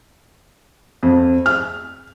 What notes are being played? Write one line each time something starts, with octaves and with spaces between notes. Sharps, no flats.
F2
F6